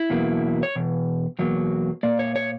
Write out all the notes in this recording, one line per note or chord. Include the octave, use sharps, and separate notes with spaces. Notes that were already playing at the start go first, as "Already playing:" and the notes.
Already playing: E4
E2 B2 F#3 A#3
C#5
E2 B2
E2 B2 F#3 A#3
A#2 A#3 D5
C#5
C#5